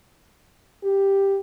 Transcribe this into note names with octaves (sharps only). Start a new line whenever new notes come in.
G4